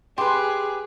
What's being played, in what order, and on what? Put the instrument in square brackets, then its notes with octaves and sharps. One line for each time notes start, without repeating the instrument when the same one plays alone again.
[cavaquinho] G4 B4 [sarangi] G#4 [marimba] C6